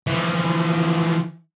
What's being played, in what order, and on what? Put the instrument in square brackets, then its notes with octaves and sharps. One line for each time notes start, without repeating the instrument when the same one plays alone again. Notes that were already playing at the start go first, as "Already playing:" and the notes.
[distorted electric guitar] E3 F3